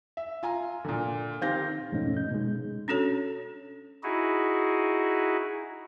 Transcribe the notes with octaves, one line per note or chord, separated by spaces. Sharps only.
E5
F4 G#5 A#5
A#2 D3
D#3 C4 G4 F5 G6 A#6
F2 G#2 B2 A3 C#4 D#4
D#4 G6
B2 G#3
C#4 D4 F#4 A4 C#5
D#4 E4 F#4 G#4